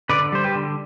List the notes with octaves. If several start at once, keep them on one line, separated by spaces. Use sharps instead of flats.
D3 B4 D5
G3 C5
G4 B4
D3